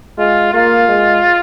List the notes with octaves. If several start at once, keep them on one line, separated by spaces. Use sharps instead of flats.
G#3 F4
A#3 F4
G#3